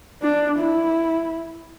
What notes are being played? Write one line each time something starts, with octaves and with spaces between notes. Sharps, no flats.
D4
E4